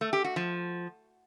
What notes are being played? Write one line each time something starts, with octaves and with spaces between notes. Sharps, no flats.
A3
G4
F#4
F3